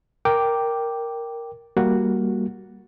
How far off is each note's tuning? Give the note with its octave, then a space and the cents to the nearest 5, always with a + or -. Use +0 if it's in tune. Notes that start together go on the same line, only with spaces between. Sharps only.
A#4 +0 G5 +0 D6 +0
G3 +0 A#3 +0 F#4 +0